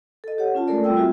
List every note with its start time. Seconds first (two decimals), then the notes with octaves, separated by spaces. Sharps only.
0.24 A4 D#5
0.38 G4 C#5 F#5
0.55 C#4 F4 A5
0.68 G#3 A3 A4 A#4 D5
0.84 G3 G#3 C4 F4 G5 E6
0.97 F4 F#4 G#4 E5